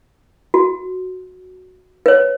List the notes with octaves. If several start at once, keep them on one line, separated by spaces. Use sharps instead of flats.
F#4
B4 C#5